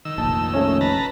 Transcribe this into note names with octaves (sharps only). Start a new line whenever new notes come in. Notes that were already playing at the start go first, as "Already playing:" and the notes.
D#3 E6
F1 A#1 A5
A3 C#4 C#5
B4 A5 A#5